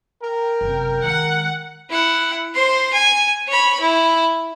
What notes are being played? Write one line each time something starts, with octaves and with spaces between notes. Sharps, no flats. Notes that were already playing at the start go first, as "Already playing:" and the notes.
A#4 G5
F#1 C3
D#3 G#3 F#5
E4 F#5
C5 C6
G#5
C#5 B5
E4